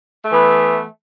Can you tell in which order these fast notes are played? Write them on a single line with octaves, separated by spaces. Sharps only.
A3 E3 B3